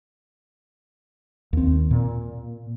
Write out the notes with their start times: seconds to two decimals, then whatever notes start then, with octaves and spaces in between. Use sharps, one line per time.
1.53 D#2 C4
1.91 A#2